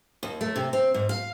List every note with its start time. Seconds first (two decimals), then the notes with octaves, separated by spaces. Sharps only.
0.23 D#2
0.41 A3
0.56 C3
0.73 C4
0.94 G#2
1.09 F5